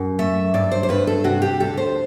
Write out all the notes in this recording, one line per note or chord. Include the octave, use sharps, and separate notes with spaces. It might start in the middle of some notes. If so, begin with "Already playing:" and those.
Already playing: F#2
A3 E5
G2 D5
C5
C5
G2 B4
A4
C3 F#4
G4
D2 A4
C5